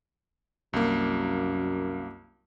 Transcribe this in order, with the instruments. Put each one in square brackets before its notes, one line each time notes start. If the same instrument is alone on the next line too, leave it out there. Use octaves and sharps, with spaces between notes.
[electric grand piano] C2 A#3 [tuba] F#2